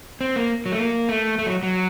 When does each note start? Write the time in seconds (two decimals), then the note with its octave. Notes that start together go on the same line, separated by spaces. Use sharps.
0.21 C4
0.36 A#3
0.66 F#3
0.72 A3
0.79 A#3
1.09 A3
1.39 A3
1.46 F#3
1.63 F#3